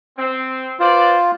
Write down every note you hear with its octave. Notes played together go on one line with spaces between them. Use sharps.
C4
F4 B4 C5 D5